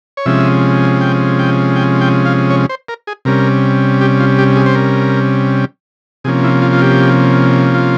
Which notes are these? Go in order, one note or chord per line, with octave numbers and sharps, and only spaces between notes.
C#5
C3 F3 G#3 C#4 E5
G5
G5
G5
G5
F5
C#5
C5
A#4
G#4
C3 G3 C#4 A#4
G4
F4
G4
G#4
C5
A#4
C3 F3 A#3 C#4 G#4
E4
F4
F4
G4
F4